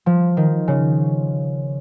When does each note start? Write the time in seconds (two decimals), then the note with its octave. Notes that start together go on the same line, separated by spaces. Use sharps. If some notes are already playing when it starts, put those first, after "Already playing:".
0.06 F3
0.37 D#3
0.68 C#3